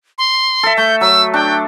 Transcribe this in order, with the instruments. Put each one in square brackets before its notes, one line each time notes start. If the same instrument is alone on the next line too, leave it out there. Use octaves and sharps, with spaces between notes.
[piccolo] C6
[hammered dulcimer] A4 E5
[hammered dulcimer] A3 [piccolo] G6
[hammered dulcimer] F#3 [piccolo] E6
[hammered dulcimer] D4 [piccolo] G5